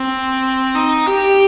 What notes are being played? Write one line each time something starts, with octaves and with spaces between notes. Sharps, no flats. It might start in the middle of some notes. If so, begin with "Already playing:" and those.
Already playing: C4
D#4
G4